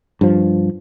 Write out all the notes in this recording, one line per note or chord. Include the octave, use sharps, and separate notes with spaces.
G2 F3